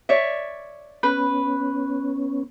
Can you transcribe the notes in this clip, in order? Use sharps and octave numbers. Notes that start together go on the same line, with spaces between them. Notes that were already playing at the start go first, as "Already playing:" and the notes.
C#5 D5 E5
B3 C#4 B4